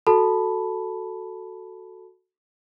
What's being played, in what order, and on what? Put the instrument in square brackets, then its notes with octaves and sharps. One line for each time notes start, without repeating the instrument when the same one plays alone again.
[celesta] F#4 A4 A5 B5